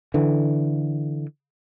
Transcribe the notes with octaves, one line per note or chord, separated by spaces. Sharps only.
D3 E3